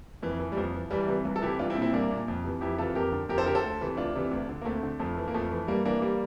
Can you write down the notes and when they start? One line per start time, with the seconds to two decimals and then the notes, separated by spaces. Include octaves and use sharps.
0.22 F2 E3
0.40 E3
0.52 G3
0.57 F2 F3
0.74 E3
0.91 C2 E3 G3
1.08 C3 E3
1.25 C2
1.36 A4
1.42 C3 E3 E4 G4
1.59 C2 D4 F4
1.70 C4 E4
1.76 A#2
1.82 C4 E4
1.93 C2 A#3 D4
2.11 A#2
2.28 F2
2.44 C3 E3
2.61 F2 E4 G4
2.78 C3 E3 F4 A4
2.95 F2 G4 A#4
3.12 D3
3.29 F2 G4 A#4
3.38 A4 C5
3.46 D3 G4 A#4
3.55 A4 C5
3.64 D2
3.81 C3 E3
3.97 D2 D4 F4
4.15 C3 E3
4.31 D2
4.49 D3
4.62 A#3
4.65 D2 A3 C4
4.83 D3
4.99 F2 F3 A3
5.17 E3
5.28 A#3
5.34 F2 F3 A3
5.51 E3
5.67 G2 G3 A#3
5.85 E3 A#3 D4
6.02 G3 A#3